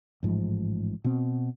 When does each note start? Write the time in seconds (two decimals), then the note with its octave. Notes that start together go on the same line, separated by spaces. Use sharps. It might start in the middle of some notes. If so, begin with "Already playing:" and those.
0.23 A1 G#2 F3
1.04 B2 C4